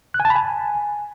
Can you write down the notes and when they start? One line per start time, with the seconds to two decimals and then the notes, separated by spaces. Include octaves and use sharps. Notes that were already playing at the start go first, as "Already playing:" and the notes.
0.14 F#6
0.20 G#5
0.25 A5
0.30 B5
0.35 G#5